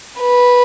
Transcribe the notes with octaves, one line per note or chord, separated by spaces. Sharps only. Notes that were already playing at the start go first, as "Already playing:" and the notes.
B4